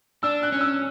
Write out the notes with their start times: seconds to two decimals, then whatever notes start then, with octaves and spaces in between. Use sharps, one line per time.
0.23 D4 E6
0.43 F#6
0.52 C#4
0.61 E6